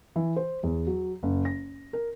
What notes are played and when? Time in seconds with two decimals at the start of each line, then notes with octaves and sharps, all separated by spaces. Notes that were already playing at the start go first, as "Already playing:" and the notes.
0.16 E3
0.36 C5
0.63 E2
0.87 F#3
1.23 F#1
1.45 A#6
1.93 A#4